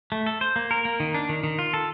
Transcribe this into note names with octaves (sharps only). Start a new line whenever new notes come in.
A3
A4
C5
A#3
A#4
A#3
D#3
D4
D#3
D#3
F4
A4